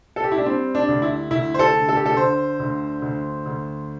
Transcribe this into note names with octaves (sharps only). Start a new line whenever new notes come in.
A4
G4
E4
D4
G3 C4
D4
D2
E4
D2 E4
C5
A4
D3
A4
G4
A4
D3 C5
D2
D2
D2